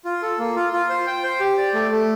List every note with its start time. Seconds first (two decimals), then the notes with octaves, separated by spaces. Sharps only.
0.05 F4
0.22 A4
0.39 A#3
0.56 F4
0.73 F4
0.89 C5
1.07 G5
1.24 C5
1.40 G4
1.58 D5
1.74 A3
1.91 A3